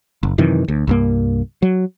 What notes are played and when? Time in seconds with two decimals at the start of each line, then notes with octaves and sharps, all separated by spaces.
0.23 F#1
0.38 F#2 C3 D#3 E3
0.68 D2
0.87 C2 G2 A#3
1.62 F#3